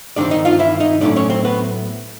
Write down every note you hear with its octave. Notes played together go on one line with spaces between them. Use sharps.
G2 D#3 G#3 C4 D4 D5
D#4 D#5
F4 F5
E4 E5
D#4 D#5
A2 F#3 A3 C#4 D4 E4 D5
C#4 C#5
C4 C5
B3 B4